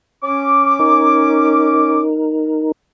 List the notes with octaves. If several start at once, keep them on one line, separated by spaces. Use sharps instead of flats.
C#4 D6
D#4 A#4